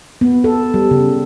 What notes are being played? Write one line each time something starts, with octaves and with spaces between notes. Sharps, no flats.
B3
A4
G3
C#3